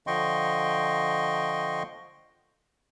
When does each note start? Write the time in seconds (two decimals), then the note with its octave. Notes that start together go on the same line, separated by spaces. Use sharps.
0.07 D3 F3 D#5 G5 C6 C#6